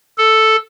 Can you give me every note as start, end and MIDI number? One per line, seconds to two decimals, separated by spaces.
0.18 0.56 69